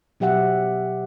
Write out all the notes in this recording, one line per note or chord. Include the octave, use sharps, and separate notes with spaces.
B2 F#3 G4 E5 F#5